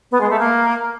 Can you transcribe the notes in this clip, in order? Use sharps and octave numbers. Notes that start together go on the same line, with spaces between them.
B3
G#3
A3
A#3